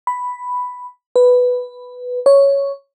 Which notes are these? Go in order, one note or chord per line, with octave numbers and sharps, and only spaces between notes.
B5
B4
C#5